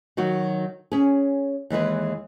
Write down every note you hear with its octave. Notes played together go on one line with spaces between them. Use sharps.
D#3 F#3 F#4
C#4 G#4
D#2 E3 G#3 B4